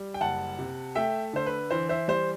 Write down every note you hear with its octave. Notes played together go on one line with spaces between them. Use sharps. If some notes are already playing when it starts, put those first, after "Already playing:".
Already playing: G3
G5
F#1 F#5 A5
C3
A3 E5 G5
D3 C5
B4
E3 C5
C5 E5
G3 C5